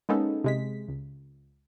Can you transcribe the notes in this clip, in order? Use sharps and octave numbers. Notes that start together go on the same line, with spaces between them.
G#3 A#3 B3 C#4 D#4 A4
C3 G#3 B6
C#2